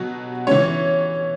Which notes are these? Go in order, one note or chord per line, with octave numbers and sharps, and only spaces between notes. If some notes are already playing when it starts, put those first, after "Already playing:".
Already playing: B2 F#3 B3
E3 C#4 C#5